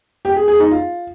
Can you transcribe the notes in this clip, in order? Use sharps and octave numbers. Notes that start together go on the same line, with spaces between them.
G4
G#4
G#4
D#4
F4